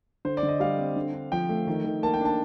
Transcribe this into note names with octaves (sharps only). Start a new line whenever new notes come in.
D3 C5
D5
D3
D#5
G3 F5
C4
D3
D4
F3 G5
A3
D#3
D#3
A#3 A5
G5
D4
A5